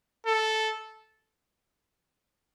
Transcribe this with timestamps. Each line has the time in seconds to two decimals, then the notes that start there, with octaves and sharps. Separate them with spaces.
0.26 A4